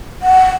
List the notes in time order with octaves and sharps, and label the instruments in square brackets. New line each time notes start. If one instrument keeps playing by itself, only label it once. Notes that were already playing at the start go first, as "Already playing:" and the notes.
[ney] F#5